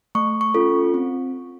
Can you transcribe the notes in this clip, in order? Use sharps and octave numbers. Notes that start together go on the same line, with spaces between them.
A3 C#6
C#6
C#4 F4 A4
C4